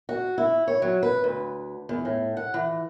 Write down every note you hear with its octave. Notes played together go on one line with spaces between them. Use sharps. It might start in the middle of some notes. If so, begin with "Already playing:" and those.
F#4
E4
C#5
F#3
B4
D2
E2
A2
F#5
E3